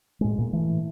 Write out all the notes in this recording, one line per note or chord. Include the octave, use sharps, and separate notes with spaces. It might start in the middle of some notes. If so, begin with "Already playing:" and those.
A2 G#3
A#2
E3 A3